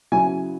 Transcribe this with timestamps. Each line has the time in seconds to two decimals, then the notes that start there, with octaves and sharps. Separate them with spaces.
0.12 C#3 F#3 E4 G#5